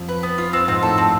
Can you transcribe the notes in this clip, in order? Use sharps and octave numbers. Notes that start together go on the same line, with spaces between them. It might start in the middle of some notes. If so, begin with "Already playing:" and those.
Already playing: F2
B4
B3
F4
F2 C4
G#2 C4
A2 A4
C4